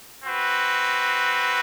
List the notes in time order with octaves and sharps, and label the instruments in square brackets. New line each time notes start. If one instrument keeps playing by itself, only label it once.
[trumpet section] C4 F#4 B4